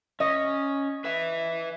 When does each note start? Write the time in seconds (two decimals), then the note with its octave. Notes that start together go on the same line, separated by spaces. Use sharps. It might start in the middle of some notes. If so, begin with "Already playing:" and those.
0.20 C#4 D#5
1.04 B4 E5